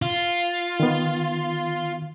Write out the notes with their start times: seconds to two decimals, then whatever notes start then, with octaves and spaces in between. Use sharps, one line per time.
0.02 F4
0.80 D#3 B3